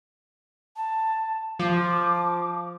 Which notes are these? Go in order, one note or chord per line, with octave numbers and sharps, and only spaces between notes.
A5
F3 D6